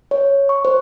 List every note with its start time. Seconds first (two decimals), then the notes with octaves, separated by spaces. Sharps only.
0.11 C#5
0.49 C#6
0.65 C5